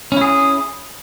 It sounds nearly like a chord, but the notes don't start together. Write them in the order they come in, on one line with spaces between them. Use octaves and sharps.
C#4 E4 G#4